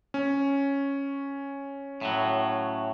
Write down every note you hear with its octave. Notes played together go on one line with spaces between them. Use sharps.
C#4
A2 F#3